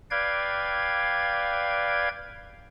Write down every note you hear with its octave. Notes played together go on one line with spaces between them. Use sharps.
B4 D5 F5 G5 G#6